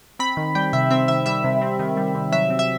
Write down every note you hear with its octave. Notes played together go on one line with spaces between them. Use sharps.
C4 B5
D#3
G3 G5
C3 E5
C4 E5
D#3 E5
G3 E5
C3
C4
D#3
G3
C3
F#3 E5
C4
E5